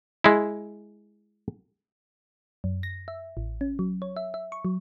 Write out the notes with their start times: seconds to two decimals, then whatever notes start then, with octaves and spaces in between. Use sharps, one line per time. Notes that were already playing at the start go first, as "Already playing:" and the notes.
0.24 G#3 E4
2.64 F#2
2.83 A#6
3.08 E5
3.37 A1
3.61 C#4
3.79 F#3
4.02 C#5
4.17 E5
4.34 E5
4.52 C#6
4.65 F#3